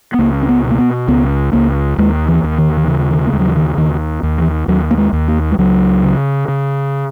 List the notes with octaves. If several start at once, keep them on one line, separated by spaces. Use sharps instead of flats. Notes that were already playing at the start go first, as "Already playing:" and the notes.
B3
C#2 A#3
C#4
B3
B2
A#3
B3
C#2 B3
C#2 A#3
D#2 G#3
E3
D#2
D#3
D#3
C#3 E3
D#3
A#3
D#2 G#3
F#3
E3
D#3
D#2 D#3
D#2
E3
D#2 F#3
A#3
G#3
D#2
A#3
G#3
C#2 F#3
C#3
C#3